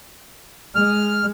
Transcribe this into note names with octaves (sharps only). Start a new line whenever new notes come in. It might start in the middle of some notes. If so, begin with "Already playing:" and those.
G#3 F6